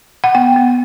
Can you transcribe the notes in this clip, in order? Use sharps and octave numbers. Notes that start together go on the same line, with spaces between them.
F#5
B3 G5
B3